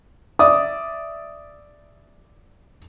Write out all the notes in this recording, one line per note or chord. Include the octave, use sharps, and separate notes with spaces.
D5 E5 D6 D#6